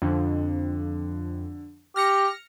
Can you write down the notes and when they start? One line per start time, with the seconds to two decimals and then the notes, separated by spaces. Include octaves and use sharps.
0.02 F2 D3
1.96 G4 F6 A#6 C#7